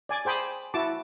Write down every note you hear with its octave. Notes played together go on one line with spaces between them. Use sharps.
D5 G#5 D6
G#4 C5 G5 B5 D6 D#6
E4 F#4 A5 D6